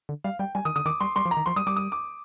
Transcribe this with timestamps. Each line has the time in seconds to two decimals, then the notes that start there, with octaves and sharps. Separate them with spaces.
0.09 D3
0.24 G3 F5
0.39 G3 G5
0.55 G3 G#5
0.65 D#3 D#6
0.76 D3 D#6
0.86 D#3 D6
1.00 G3 C6
1.16 G3 C6
1.25 F3
1.31 A#5
1.37 D#3
1.46 F3 C6
1.56 G3 D#6
1.67 G3 D6
1.76 D#6
1.92 D6